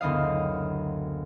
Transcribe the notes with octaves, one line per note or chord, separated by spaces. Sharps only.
F#1 D2 B3 D#5 F5